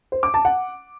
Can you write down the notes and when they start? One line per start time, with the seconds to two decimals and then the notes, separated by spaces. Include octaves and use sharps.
0.12 C5
0.23 D6
0.34 A5
0.45 F#5